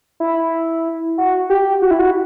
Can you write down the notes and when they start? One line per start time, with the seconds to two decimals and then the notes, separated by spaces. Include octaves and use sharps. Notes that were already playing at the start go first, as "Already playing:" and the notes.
0.20 E4
1.18 F#4
1.50 G4
1.82 F#4
1.91 E4
1.99 F#4